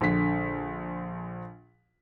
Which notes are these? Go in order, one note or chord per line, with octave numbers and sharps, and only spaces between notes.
A#1 D3 B6